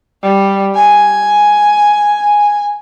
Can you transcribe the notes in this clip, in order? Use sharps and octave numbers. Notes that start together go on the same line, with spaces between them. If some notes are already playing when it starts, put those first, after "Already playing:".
G3
G#5